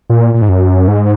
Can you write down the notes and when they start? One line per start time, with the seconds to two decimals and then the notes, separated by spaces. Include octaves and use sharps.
0.10 A#2
0.34 A#2
0.42 G#2
0.49 F#2
0.88 G#2